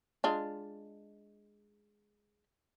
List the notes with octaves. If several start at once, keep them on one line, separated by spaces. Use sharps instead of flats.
G#3 D4 F4